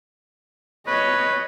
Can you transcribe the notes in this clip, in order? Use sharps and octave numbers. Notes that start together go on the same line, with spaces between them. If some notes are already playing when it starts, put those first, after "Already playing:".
B4 C#5 D#5